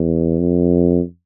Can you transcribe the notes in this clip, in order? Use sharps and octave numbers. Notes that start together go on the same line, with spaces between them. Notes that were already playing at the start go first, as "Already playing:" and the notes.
Already playing: E2
F2